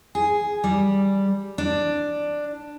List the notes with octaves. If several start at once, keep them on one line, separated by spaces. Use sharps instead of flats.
G#4
G3
D4